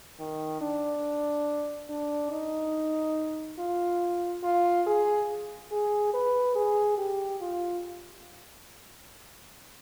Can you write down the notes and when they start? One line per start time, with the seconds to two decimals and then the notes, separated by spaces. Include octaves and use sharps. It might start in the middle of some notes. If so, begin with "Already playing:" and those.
0.19 D#3
0.61 D4
1.89 D4
2.31 D#4
3.59 F4
4.43 F4
4.87 G#4
5.71 G#4
6.13 B4
6.55 G#4
6.98 G4
7.41 F4